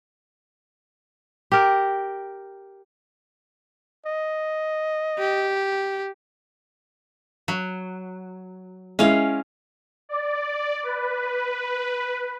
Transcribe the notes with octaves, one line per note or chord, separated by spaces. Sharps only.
G4 A#4
D#5
G4
F#3
G#3 C#4 E4 F5
D5
B4